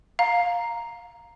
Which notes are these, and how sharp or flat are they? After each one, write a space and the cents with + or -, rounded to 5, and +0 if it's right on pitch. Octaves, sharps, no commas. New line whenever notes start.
F5 +15 A#5 +0